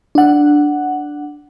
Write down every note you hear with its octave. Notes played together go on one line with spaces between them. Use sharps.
D4 F#5